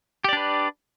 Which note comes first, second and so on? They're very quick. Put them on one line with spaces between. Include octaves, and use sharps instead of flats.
G4 D5 D4 B4